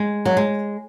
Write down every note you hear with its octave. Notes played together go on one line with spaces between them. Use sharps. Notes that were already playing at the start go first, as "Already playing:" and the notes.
Already playing: G#3
F#3
G#3